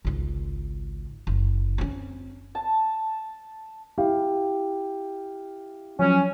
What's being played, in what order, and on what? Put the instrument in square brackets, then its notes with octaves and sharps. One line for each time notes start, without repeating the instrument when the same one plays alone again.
[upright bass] G#1 C#2
F#1
C4 C#4
[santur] A5
[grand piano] E4 G4 F5
[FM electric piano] F3 F#3 [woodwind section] C#4